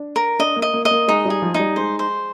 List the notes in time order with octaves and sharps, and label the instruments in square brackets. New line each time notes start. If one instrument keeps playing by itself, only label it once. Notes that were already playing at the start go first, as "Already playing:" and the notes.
Already playing: [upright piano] D4
[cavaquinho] A#4
[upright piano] D4 [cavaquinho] D#5
[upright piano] A#3
[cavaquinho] D#5
[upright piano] A#3
[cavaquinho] D#5
[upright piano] A#3
[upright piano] G#3 [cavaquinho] D#4
[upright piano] G3 [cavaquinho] G#4
[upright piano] F3
[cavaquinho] D#4
[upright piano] G3
[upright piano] G#3 [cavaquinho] C5
[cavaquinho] C5